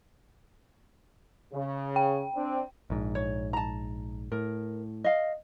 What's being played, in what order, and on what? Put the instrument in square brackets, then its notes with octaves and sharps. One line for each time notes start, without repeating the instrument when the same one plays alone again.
[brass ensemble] C#3
[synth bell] G5
[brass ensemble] C4 D4
[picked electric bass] A#1 G#2
[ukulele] C#5
A5 A#5
[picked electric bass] A2 [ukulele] A#4
[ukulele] D#5 F5